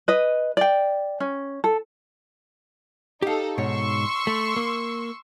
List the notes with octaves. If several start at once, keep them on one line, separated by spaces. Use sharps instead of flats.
B4 D#5
D5 G5
C#4
A4
D#4 G4 A4 F5
G#2 B2 C#5 C6 C#6 E6
A3
A#3